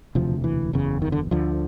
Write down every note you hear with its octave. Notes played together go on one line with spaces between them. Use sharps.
E1 D2 C3 F3
E3
F#1 E2 C#3
D#3
D3
D2 D3 F3